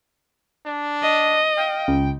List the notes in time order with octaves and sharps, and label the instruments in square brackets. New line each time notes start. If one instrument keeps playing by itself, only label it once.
[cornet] D4
[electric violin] D#5
[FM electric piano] F5 [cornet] G5
[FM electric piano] C#2